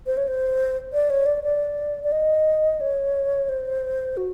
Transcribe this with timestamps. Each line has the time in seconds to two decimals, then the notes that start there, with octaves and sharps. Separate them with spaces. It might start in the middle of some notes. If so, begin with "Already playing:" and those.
0.07 C5
0.17 C#5
0.27 C5
0.93 D5
1.10 C#5
1.26 D5
1.44 D5
2.04 D5
2.12 D#5
2.81 C#5
3.49 C5
4.17 F#4